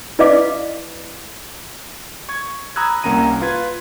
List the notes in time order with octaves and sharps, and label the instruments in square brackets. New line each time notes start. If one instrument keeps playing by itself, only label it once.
[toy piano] E4 B4 D5 D#5 F5 D6
[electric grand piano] C#6 G#6
A#5 B5 D#6 E6 F#6 G#6
C2 A#3 C#4 A#5 D#7
F4 B4 G#6